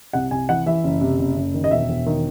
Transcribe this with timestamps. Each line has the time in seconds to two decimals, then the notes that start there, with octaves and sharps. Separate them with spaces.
0.13 C2 F#5
0.31 C2 G#5
0.49 E3 F#5
0.66 E3 E5
0.84 F#1
1.01 C3
1.19 F#1
1.36 F#1
1.54 D#3
1.64 D#5
1.71 E1 E5
1.89 E1
2.06 D#3